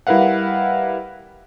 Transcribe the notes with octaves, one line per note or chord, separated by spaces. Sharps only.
G3 E4 A#4 B4 F5 F#5